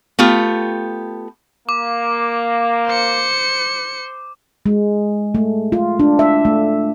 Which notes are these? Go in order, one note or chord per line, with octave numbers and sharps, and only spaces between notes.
A3 B3 F4 G4
A#3 D6
C5 C#7
G#3
A3
F4
D4
E5
A3